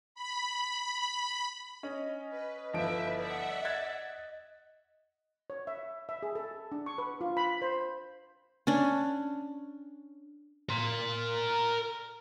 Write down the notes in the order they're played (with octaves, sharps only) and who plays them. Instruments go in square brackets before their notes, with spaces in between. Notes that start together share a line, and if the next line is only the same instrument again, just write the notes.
[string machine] B5
[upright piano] C#4 [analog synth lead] D#5
[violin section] B4
[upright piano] G1 F3 D7 [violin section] E4 B4 E5
[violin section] D5 E5 F#5
[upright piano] F#6 G#6 A6
[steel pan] C#5
E5
E5
G#4
A4
D4
C#6
B4
F4
B5
C5
[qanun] C#4 D4
[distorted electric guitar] A#4 C6